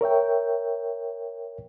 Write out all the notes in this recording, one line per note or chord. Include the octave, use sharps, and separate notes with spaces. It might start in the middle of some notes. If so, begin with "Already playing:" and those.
A#4 C#5 E5 G5